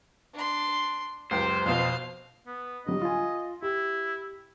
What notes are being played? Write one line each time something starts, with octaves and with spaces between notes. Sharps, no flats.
D4 C6
C#2 F#2 G4 C5
F2 B2 F5
B3
D3 F#3 G3 D#5
F4 G#5
E4 G4